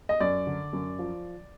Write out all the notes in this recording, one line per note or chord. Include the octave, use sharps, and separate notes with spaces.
D#5
F#2 D5
D3
F#2
F3